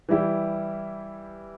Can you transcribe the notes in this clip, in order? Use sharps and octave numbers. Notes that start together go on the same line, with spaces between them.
E3 G3 E4 G4